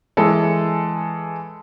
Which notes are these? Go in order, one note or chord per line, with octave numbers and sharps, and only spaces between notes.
E3 G#3 A4